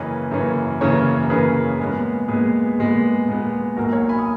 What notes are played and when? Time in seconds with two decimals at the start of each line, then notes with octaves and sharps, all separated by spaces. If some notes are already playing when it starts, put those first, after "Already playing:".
Already playing: F#2 C#3 E3 A#3 C#4 B4 D#5
0.31 F#2 C#3 E3 A#3 C#4
0.81 F#2 C#3 E3 A#3 C#4 A#4 C#5
1.25 A#4
1.30 F#2 C#3 E3 A#3 C#4 G#4 B4
1.80 A#2 G#3 B3
2.28 A#2 G#3 B3 G#4 B4
2.79 A#2 G#3 B3
3.28 A#2 G#3 B3
3.77 B1 A#2 A#3 F#4 A#4
3.93 A#4 C#5
4.09 G#5 B5
4.19 D#6